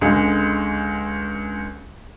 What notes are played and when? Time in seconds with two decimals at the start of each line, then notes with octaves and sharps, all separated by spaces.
0.01 C#2 D3 G#3